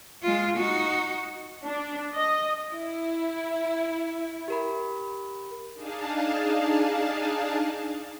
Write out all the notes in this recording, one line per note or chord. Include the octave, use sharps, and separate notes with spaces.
G#3 F4
D#4 F#4
D4
D#5
E4
G4 A#4 B5
D4 D#4 G#4 F5 A5